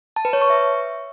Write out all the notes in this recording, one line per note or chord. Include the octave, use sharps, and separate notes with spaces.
A5
B4
C#5
C#6
E5